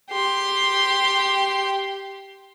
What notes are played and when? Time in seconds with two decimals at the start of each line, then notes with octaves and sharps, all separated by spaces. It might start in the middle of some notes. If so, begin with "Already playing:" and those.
0.12 G4 C6